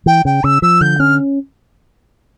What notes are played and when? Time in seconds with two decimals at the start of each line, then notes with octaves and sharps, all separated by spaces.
0.06 E3 G5
0.25 C#3 G5
0.44 C#3 E6
0.62 F3 E6
0.81 D3 G6
0.99 C#4 F6